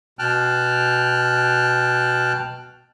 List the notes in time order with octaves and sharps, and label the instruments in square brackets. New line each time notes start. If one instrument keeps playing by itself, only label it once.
[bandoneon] B2 G5 A5 F6 F#6